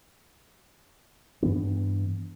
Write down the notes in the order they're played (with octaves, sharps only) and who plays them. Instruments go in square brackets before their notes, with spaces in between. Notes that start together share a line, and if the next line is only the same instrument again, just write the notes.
[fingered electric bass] G2 E3 B3 D4